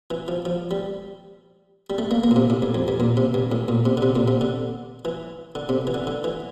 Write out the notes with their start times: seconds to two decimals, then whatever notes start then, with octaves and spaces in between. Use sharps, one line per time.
0.11 E3
0.28 F3
0.45 F3
0.71 G3
1.90 G3
1.98 A3
2.11 A#3
2.24 A#3
2.31 A#2
2.36 C3
2.50 A2
2.62 G2
2.75 F2
2.88 G2
3.00 A#2
3.17 C3
3.34 G2
3.52 A2
3.68 A#2
3.86 C3
3.97 D3
4.02 C3
4.15 A#2
4.28 C3
4.41 D3
5.05 E3
5.55 D3
5.69 C3
5.87 E3
5.94 D3
6.07 D3
6.24 E3